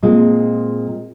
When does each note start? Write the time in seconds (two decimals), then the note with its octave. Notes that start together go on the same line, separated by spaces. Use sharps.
0.03 A#2 G#3 C4